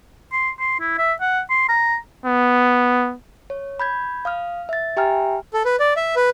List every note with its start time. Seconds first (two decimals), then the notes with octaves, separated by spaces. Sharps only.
0.32 C6
0.59 C6
0.80 E4
0.98 E5
1.21 F#5
1.50 C6
1.69 A#5
2.26 B3
3.50 C#5
3.80 B5 G6 G#6
4.25 F5 D#6 F6
4.69 E5 A6
4.97 G4 E5 G5 G#5 A#5 F6
5.53 A4
5.65 B4
5.80 D5
5.97 E5
6.16 B4